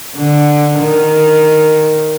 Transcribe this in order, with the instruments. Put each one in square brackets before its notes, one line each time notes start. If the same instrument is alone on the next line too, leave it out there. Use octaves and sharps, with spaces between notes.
[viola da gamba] D3
D#3